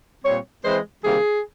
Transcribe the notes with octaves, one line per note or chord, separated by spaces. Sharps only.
A#2 G3 C4 C#5
E3 G#3 C4 C5
C3 D#3 G3 A#3 G#4